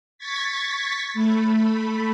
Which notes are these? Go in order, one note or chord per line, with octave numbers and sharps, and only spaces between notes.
C#6 G#6 A6 B6
A3 B5